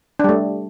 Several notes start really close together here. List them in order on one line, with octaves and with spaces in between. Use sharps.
D4 G3 A3